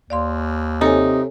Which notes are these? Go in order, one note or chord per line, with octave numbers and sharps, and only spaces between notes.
D#2 D5 F5 C6
C3 D#4 A4 C#5 G#5